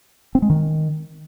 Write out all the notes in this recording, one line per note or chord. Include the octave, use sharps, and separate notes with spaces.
C4
G#3
D#3